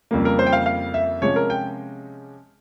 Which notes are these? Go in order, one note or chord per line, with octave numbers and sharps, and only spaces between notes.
F2 C#3 G3 A#3
A#4
C5
G5
F5
F5
E5
C3 F3 G#3 C#4 C#5
A#4
G5